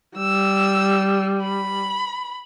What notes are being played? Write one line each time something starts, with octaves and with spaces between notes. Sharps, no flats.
G3 E6
B5